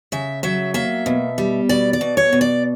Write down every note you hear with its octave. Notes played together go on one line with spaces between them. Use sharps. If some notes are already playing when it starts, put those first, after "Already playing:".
C#3 E5
F#3 E5
A#3 E5
B2
G3
B2 D5
D5
B2
C#5
B2
D5